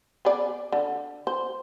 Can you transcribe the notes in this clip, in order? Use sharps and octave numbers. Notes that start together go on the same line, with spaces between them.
B3 G#4 D5
D3
C5